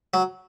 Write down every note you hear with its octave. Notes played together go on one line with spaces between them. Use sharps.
F#3